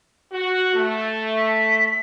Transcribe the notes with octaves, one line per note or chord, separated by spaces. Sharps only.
F#4
A3
B6